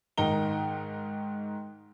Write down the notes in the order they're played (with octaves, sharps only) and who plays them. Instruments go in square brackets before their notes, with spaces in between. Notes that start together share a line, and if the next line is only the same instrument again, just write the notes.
[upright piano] G#2 D#3 D#4 A#5 G7